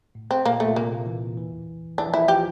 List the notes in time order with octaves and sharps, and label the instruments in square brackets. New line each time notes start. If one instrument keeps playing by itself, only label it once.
[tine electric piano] A2
[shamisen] C4
[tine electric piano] A#2 [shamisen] A#3
[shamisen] A3
[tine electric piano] A#2
[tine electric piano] C3 [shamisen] A#3
[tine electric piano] E3
E3
[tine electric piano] E3 [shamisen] D4
[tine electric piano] F3
[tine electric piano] E3 [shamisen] E4
[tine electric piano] F3 [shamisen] G4